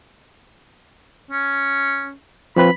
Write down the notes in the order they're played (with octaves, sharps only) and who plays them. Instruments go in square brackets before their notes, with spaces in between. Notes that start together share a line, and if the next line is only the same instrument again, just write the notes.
[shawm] C#4
[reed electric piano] F3 C4 B4 [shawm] B5